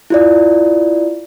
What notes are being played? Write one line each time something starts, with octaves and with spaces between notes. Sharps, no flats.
E4 F4 D5